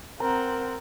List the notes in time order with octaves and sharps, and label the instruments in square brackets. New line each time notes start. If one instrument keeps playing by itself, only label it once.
[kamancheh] C4 F#5 [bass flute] A#4 [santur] A#5